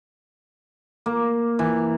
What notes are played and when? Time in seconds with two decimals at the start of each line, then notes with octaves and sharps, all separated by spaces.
1.06 A#3
1.59 E3